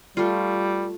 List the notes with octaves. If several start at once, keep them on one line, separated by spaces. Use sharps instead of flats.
G3 A3 F4